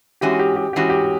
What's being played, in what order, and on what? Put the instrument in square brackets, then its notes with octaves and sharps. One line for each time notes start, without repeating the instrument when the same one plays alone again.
[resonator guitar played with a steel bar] E3 G#3 C#4 F#4 [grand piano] G4
[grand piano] G4
G4
[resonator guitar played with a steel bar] E3 G#3 C#4 F#4 [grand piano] G4
[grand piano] G4